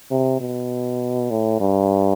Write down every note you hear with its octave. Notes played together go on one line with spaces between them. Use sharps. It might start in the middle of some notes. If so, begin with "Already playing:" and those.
C3
B2
A2
G2